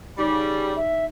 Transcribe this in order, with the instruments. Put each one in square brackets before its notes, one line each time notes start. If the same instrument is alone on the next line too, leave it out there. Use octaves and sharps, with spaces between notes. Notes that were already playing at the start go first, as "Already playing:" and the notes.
[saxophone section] C#3 G3 [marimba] D#4 D5 D6
[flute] E5